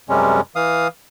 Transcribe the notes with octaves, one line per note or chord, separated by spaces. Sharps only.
F#2 C3 G3 G#3 C#4
E3 F5 D#6